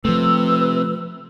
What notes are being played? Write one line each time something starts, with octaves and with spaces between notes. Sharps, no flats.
C3 F3 A3 B4 E6